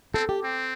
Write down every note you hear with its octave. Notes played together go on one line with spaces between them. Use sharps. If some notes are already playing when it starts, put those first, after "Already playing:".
C4 A4
G4
C4